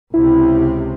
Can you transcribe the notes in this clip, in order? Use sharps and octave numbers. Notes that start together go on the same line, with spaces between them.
C#2 C3 E4